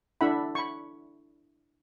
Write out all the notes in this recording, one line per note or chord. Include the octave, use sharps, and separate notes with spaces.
D4 E4 A4 E5 F#5 B5
B5 C#6